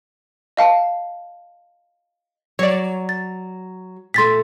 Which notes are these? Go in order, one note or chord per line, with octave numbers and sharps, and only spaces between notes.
D#5 F5 A5
F#3 C#5 D5
A6
A#2 A3 C6 A6 B6